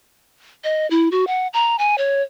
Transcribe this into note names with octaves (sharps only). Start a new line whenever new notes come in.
D#5
E4
F#4
F#5
A#5
G#5
C#5